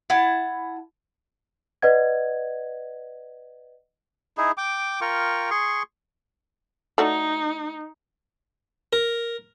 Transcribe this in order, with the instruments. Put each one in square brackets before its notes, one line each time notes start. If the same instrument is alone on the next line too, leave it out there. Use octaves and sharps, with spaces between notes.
[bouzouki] E4 F#5 A5
[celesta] B4 D5 D#5 F#5 G#6
[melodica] D#4 E4 G#4
G5 D6
F4 A#4 G5 C#6
G#4 C6 C#6
[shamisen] A3 F#4 D5 [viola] D#4
[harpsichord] A#4